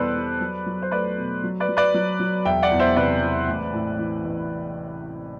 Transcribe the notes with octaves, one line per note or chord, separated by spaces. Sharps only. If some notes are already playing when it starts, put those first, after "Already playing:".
Already playing: E2 B2 G3 A4 B4 C5 D5
G3
F#3
F#3
C5
A3 B4 D5
B2
F#3
B4 D5
F#3
B4 D5
F#3
F#3
E1 E5 G5
D5 F#5
E2
C5 E5
C3 B4 D5
E3
A1
A2
E3
A1